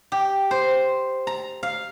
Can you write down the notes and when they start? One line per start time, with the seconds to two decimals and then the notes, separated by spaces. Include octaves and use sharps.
0.12 G4
0.51 C5
1.27 A#5
1.63 F5